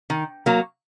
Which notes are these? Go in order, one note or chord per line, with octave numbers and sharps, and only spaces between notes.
D#3
F#3 A#3